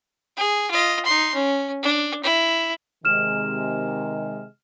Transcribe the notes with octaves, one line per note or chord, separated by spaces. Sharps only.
G#4
F4 D#5
D#4 C6
C#4
D4
E4
C3 D#3 G#3 F6 E7